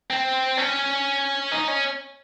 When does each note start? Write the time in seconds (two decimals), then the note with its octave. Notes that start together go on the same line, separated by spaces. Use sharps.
0.10 C4
0.57 C#4
1.52 D#4
1.68 C#4